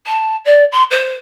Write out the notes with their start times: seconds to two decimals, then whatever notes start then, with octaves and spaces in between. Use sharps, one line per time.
0.06 A5
0.45 D5
0.72 C6
0.90 C5